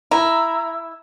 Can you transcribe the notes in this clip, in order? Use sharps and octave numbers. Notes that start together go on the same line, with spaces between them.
E4 A#5